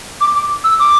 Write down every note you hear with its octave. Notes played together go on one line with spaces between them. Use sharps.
D6
D6
E6
D6